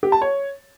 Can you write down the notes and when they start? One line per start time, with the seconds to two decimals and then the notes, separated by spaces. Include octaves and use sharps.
0.03 G4
0.12 A5
0.22 C#5